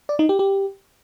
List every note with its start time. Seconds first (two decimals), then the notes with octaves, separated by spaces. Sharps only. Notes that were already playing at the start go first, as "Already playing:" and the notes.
0.09 D5
0.19 D#4
0.29 G4
0.39 G4